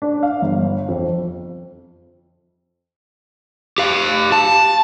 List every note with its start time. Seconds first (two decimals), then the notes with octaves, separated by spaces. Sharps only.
0.02 D4
0.23 F5
0.42 G1
0.88 F2
3.78 G4 F5
4.32 A5